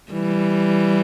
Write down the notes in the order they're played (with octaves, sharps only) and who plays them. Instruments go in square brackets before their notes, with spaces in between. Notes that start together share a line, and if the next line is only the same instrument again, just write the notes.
[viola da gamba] E3 G3